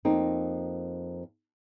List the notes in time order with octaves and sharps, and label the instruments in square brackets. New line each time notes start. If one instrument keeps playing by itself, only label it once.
[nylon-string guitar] F2 A#3 C4 D#4